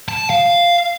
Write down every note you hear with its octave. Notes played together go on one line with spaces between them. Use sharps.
A5
F5